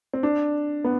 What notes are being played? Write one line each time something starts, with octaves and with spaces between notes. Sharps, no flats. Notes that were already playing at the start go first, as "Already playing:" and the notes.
C4
D4
B3